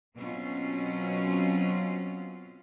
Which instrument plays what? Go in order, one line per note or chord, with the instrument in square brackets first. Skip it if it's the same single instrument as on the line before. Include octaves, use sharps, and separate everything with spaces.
[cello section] B2 F#3 C4 C#4 F4